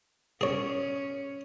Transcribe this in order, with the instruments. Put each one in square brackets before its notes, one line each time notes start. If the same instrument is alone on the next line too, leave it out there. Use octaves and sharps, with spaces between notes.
[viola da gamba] C#4 [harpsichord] G#4 C#5